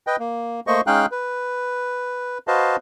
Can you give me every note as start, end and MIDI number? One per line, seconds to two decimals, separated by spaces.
0.07 0.16 71
0.07 0.16 75
0.07 0.16 79
0.20 0.60 58
0.67 0.81 57
0.67 0.81 58
0.67 0.81 72
0.67 0.81 75
0.67 0.81 85
0.87 1.06 56
0.87 1.06 61
0.87 1.06 63
0.87 1.06 77
0.87 1.06 79
0.87 1.06 90
1.12 2.38 71
2.48 2.76 66
2.48 2.76 71
2.48 2.76 72
2.48 2.76 75
2.48 2.76 77
2.48 2.76 81